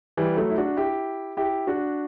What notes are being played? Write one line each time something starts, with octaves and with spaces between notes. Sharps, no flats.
E3 G3
F#3 A3
E4
D4 F#4
E4 G4
E4 G4
D4 F#4